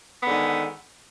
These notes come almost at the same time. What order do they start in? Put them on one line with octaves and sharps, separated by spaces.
B3 D3 G#2 D#3